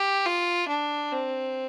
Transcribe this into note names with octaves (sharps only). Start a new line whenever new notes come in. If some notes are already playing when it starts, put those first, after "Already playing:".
Already playing: G4
F4
D4
C4